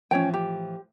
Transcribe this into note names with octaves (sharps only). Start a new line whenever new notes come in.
A2 E3 F3 C#4 C#5 G5
G4